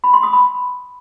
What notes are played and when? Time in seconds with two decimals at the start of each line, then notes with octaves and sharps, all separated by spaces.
0.04 B5
0.13 C6
0.23 D#6
0.33 B5